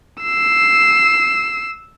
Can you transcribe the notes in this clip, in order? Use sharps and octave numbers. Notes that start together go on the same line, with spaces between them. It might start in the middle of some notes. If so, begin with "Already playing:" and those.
E6 C7